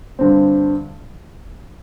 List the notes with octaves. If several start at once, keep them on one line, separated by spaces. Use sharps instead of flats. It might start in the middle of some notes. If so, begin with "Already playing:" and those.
G2 D3 C4